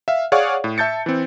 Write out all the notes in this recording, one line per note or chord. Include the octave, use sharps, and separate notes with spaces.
E5 F5
G#4 C#5 D5 F5 F#5 C#6
A2
E5 A5 G6 A6 C#7
E3 C4